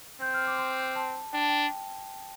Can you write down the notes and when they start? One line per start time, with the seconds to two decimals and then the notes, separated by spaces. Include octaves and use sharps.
0.21 C4 G6
0.34 F6
0.47 D6
0.58 C6
0.96 A5
1.33 D4 G5
1.41 A5
1.49 G5